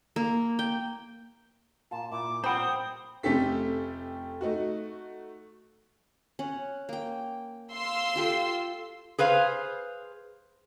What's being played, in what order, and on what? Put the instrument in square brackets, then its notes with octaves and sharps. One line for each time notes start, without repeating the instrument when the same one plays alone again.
[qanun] A#3
G5
[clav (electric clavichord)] A#2 F4 [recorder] A5
[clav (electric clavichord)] A#2 E4 [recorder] D6
[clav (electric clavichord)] A#2 F3 G3 [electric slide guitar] C5 G5 [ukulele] F#5 B5 [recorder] D#6
[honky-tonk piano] F1 A3 C#4 G4 A4 B6
A3 D#4 F#4
[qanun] C#4 F#5
A#3 G5
[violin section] F5 C6 E6
[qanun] F4 G4 A4
[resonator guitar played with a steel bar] G#4 B4 C5 F5